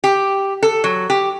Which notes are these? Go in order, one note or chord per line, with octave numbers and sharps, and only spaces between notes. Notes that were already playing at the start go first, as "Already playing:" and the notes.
G4
A4
F#3
G4